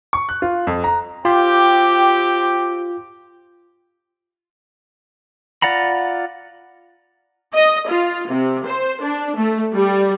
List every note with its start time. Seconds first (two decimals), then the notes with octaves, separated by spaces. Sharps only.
0.13 C#6
0.29 F#6
0.42 F4
0.67 F2
0.84 A#5
1.25 C4 F4 G4
5.62 F4 D5 F#5 A#5 B5
7.54 D#5
7.88 F4
8.28 C3
8.66 C5
9.02 D4
9.36 A3
9.73 G3